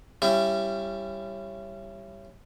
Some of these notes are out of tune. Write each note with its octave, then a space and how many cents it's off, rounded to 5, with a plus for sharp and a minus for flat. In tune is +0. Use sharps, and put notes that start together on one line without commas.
G3 +0 C#4 -10 E4 +25